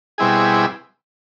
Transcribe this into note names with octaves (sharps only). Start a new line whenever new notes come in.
B2 G3 C4 E4 G#4